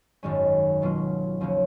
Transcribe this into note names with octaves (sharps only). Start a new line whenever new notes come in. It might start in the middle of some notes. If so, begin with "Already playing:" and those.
G#1 F#2 D#3 G#3 C#4
B2 F#3 A#3 C#4 F4
D#2 C#3 F3 A#3 C#4